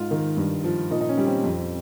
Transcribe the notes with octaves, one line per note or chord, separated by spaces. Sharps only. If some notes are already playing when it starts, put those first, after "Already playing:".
Already playing: G#2 F4
D#3
G2
F3
A#2 D#4
D#4
C#4
G3
C4
F2